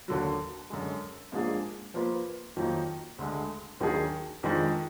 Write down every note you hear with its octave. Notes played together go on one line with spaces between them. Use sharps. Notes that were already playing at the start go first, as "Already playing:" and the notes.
D#2 D3 F#3
F#2 D3 G#3
G#2 F3 A#3 D4 G#4
F3 A#3 F4 B4
F2 D#3 F#3 A#3 D#4
D2 D3 G#3
D#2 D#3 F#3 D4 G#4
F2 D#3 G#3 D4